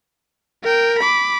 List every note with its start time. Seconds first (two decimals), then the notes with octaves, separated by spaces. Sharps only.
0.63 A#4 G5
0.99 B5 D6